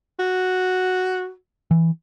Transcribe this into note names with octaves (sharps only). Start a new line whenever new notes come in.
F#4
E3